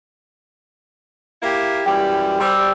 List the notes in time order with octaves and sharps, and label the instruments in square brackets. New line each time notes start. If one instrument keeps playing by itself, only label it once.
[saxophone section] A#3 E4 G4
[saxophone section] F#2 E3 G3 [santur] G5
[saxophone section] G3 [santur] C5 E6